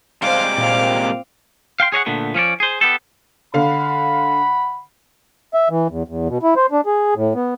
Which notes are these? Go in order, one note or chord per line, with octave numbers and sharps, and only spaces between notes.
C3 G3 G#3 C5 F5 D6
A#2 C4 F5
F5 G5 C6
G#4 C#5 D#5 F#5
A#2 D3 A3 B3
F3 C#4 C#5 D5
G#4 C5
B3 G4 A4
D3 F5 F#5 B5
E5
E3
E2
E2
B2
E4
C5
D4
G#4
A2
B3